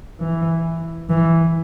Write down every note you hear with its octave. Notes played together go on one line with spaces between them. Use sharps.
E3
E3